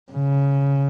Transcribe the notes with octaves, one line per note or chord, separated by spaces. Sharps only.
C#3